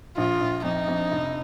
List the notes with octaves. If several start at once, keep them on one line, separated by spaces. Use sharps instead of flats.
A#1 F4
A#1
F2 D#4
F2
F1